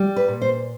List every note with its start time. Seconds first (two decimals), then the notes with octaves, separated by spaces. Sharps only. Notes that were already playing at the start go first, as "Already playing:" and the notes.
Already playing: G3
0.16 B4
0.28 A#2
0.41 C5